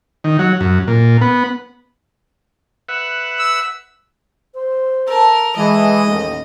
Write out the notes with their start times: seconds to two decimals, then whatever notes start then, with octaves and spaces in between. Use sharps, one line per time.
0.24 D#3
0.39 F#3
0.61 F#2
0.87 A#2
1.21 B3
2.89 B4 E5 F#5
3.39 E6
4.54 C5
5.08 A4 A#4 A5
5.56 E3 G#3 D#5
6.07 A1 D#2